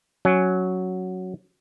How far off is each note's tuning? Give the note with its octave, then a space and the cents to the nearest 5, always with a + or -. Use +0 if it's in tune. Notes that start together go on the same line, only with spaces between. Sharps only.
F#3 +0 C#4 +0